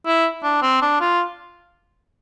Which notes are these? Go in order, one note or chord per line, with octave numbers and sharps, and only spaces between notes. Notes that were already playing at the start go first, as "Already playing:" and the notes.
E4
D4
C4
D4
F4